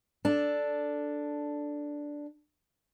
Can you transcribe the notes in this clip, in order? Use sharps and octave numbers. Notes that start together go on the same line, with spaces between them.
D4 A4